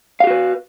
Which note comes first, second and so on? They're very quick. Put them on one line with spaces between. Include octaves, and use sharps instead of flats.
F5 G4 F#4 B4